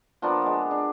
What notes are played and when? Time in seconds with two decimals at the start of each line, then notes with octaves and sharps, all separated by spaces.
0.22 F3 A#3 B3 D4
0.42 G#3 B3
0.71 D4